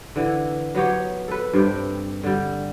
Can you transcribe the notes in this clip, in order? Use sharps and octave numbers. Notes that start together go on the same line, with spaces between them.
D3 E3
F#3 B3 G4 C#5
A4 B4
G2 C3 G3 G5
D3 G3